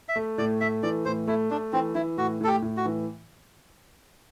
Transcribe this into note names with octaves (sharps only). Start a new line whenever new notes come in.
E5
A3
A2 D5
A3 E5
E3 D5
A2 C5
A3 E4
A3 D4
E3 C4
E3 E4
A2 F#4
A2 A4
G4
A2
F#4
E3